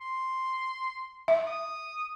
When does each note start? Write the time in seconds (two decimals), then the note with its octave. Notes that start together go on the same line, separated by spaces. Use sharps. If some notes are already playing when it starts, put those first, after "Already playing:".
0.01 C6
1.28 E5
1.47 D#6